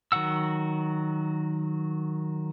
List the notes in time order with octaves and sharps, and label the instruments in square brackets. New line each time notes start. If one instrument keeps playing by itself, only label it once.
[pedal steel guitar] D#3 F#3 F#4 F#5 E6